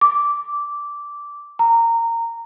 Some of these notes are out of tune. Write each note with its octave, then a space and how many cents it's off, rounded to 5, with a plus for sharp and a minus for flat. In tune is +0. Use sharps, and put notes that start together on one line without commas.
D6 -10
A#5 -20